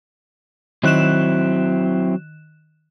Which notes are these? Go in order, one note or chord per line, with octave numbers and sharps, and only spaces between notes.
D#3 F#3 C4 E4 F#6 E7